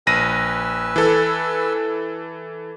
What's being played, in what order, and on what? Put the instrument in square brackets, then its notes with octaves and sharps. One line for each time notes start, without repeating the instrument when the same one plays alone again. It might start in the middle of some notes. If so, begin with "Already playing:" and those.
[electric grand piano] A#1 A#6 D#7 [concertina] B4 G#5 E6
[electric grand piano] E3 A4